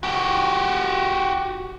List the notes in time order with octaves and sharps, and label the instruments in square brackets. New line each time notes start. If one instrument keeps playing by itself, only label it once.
[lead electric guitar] F#4 G4